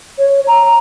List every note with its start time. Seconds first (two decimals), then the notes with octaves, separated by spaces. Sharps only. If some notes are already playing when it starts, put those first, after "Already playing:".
0.18 C#5
0.48 A#5